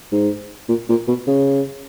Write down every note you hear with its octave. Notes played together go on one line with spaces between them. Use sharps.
G#2
A#2
A#2
B2
C#3